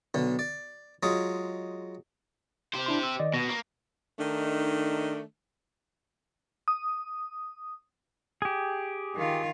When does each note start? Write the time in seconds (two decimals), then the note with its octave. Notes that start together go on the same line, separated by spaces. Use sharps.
0.14 B1 D3
0.39 D5
1.03 F#3 G#3 F4 G#4
2.74 G4 C5
2.86 D4 E4 C6
3.03 E6
3.19 D#3 D5 D#5
3.34 B2 A#6
3.48 A#3
4.19 D#3 A3 D4 D#4
6.68 D#6
8.42 G4 G#4
9.15 D#3 F4